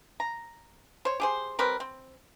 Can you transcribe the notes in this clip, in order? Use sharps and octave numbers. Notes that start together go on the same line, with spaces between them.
A#5
C5 C#5
G4 G#4 C5
G3 C4 A#4 B4
C4